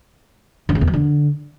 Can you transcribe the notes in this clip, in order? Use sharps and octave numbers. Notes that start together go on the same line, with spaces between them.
D3
C#3
E2
F#3
D3